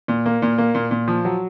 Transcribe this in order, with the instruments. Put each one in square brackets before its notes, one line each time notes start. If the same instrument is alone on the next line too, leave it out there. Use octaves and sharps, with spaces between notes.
[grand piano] A#2
A#3
A#2
A#3
A#2
A#2
F3
F#3